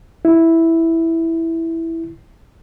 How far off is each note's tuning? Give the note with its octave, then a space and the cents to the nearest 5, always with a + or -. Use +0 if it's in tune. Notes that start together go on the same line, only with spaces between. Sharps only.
E4 -5